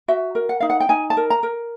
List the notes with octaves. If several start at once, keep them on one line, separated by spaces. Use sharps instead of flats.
F#4 E5
A#4
F#5
D#4 F5
F#5
G5
D#4 G#5
A5
A#4
A#5
A#4